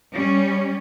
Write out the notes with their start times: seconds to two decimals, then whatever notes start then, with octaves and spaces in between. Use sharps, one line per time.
0.15 G3 C#4